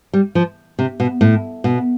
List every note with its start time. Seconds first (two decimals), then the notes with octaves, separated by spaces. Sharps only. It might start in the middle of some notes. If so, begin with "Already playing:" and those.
0.13 G3
0.35 F3
0.79 C3
1.00 B2
1.21 A2
1.64 B2